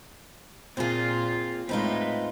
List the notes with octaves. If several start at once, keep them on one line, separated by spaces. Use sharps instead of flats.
A#2 C4 F4 G#4
A2 G#3 C4 D#4 F4 B4